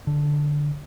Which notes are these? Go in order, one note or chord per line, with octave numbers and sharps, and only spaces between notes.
D3